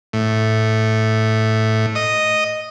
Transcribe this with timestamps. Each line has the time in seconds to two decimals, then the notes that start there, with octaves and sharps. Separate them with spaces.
0.13 A2
1.95 D#5